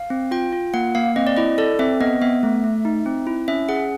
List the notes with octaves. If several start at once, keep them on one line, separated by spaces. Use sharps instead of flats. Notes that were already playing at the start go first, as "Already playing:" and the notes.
Already playing: F5
C4
F4 G5
F4
A#3 F#5
A#3 F5
C4 D#5
D5
E4 D#5
A4 D5
C4 E5
B3 D#5
B3 E5
A3
A3
D#4
C4
E4
C#4 E5
G#4 F#5